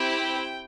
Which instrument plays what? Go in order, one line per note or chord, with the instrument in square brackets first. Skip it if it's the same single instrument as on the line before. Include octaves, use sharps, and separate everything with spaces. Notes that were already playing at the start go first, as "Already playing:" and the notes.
Already playing: [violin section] C4 E4 G4 G5